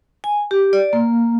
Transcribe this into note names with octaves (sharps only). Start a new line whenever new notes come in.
G#5
G4
D5
A#3